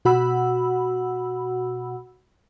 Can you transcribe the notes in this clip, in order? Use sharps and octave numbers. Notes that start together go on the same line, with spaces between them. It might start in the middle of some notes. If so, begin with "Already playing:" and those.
B2 F#4 F#5 B5 E6